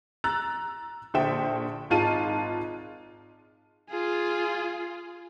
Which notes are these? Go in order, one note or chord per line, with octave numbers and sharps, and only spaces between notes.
A#5 E6 F#6 A6
A#1 D3 C5 E5 G5 E7
G#1 G#2 F4 A5 D#7
F4 G#4